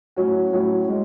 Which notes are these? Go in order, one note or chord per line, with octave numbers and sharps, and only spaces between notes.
A2 F#3 C#4 F#4
A2 F#3 C#4 F#4
G#3 C#4